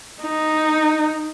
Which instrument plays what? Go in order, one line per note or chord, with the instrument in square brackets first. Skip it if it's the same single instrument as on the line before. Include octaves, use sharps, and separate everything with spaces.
[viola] D#4